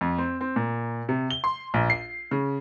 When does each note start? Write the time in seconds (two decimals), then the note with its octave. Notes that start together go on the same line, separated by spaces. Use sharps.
0.01 F2
0.18 C4
0.41 C4
0.56 A#2
1.09 C3
1.30 G7
1.44 C6
1.74 A#1
1.90 C7
2.31 C#3